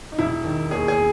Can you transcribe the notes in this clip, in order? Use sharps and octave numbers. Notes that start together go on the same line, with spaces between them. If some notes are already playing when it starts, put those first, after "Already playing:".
D#4
E1 E4
D#3
D#2 G#4
G#4